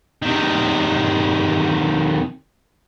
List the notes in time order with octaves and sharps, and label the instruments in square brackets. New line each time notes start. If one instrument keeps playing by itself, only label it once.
[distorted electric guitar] C3 D#3